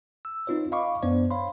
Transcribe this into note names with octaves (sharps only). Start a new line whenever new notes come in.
E6
C4 D#4 F4 B4 C#5
D#5 F5 B5 C#6 D6
F#2 B3 D4 C5 D5
C#5 F5 B5 C6